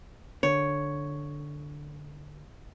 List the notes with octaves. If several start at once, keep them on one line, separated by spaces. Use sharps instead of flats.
D3 C#5